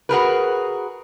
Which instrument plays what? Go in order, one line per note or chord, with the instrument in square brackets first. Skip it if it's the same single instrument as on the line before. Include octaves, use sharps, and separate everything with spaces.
[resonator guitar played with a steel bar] F#4 G#4 A#4 B4